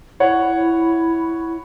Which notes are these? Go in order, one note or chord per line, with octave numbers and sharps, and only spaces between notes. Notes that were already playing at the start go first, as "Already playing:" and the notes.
E4 C#5 F#5